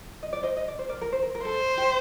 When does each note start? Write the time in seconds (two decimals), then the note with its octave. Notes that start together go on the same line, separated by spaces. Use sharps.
0.23 D#5
0.33 D5
0.43 C5 D#5
0.57 D#5
0.68 D5
0.79 C5
0.89 A#4 D5
1.01 A#4
1.13 C5
1.22 A#4
1.35 A#4
1.45 A4 C5
1.77 G4